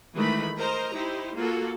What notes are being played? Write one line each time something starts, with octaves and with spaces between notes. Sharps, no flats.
D#3 E3 G#3 A3 B5
A#4 C5 D#5 A#5
D#4 E4 G4 C5
A#3 F4 F#4 A4